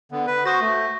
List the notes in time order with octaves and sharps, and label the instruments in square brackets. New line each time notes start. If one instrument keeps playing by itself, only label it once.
[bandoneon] D3 B3
B4
[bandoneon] F#4 C5 [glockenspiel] C#6 D#6 A#6
[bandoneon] A3